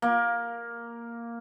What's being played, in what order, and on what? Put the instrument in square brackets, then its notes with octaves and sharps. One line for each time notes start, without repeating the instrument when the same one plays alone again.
[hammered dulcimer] A#3